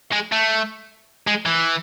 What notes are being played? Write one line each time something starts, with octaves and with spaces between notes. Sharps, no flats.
G#3
A3
G#3
E3